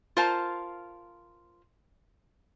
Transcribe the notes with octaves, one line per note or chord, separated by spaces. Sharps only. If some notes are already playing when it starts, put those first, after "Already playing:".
F4 A#4 C5 F5 A5